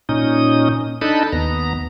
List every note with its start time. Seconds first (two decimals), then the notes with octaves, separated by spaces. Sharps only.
0.09 A#2 C#4 D#4 D#6
1.02 D4 D#4 A4 D#5 A5 B5
1.32 D#2 B3 A#5